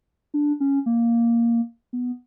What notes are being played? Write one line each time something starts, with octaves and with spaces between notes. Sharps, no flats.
D4
C#4
A#3
B3